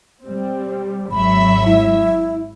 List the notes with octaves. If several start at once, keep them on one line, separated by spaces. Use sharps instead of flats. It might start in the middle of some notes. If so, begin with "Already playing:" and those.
G3 C4
G#1 F#3 E5 B5
E4